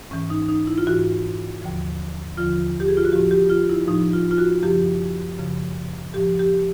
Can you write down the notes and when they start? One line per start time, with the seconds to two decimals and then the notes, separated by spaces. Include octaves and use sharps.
0.11 G#2 E3 C#4
0.30 D#4
0.49 D#4
0.67 E4
0.78 F4
0.87 G#2 E3 F#4
1.62 D#2 D3 F3
2.37 D#2 D3 F3 F4
2.80 G4
2.88 G#4
2.97 F4
3.05 F#4
3.12 A2 F3 G4
3.31 G4
3.50 F4
3.69 E4
3.87 A2 F3 D#4
4.13 F4
4.31 F4
4.38 F#4
4.63 F#2 C#3 F3 G4
5.38 F#2 C#3 F3
6.13 A2 F3 G4
6.39 G4